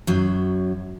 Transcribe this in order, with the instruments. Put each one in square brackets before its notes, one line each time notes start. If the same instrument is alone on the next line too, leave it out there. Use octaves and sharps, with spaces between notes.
[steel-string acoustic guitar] F#2 F#3